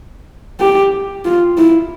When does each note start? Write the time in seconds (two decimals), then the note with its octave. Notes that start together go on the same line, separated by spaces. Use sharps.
0.60 G4
1.25 F4
1.57 E4